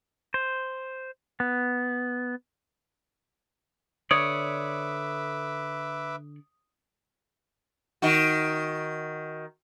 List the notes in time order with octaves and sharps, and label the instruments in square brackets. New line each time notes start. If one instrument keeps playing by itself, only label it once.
[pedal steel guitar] C5
B3
[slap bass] D3 [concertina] B4 E5 D6 [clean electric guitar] C#5 D5 [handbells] D#6
[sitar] D#3 F#4